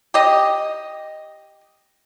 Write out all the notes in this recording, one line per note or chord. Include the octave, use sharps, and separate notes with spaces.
G4 D#5